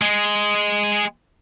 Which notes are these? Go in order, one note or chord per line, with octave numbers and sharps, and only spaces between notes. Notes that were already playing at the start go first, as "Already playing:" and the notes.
G#3